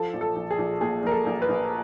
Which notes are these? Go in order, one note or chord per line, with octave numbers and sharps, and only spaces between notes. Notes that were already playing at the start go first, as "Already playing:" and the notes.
Already playing: F3 A4
A#1
A4
A#1
G#4
A#1
A#2 G#4
A#1 A#4
A4
A#1
B4
A#1